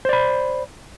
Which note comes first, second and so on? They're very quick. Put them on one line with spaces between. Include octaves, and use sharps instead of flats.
C5 D5 B5